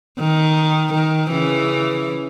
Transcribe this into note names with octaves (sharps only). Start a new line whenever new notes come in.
D#3
D#3
C#3 E3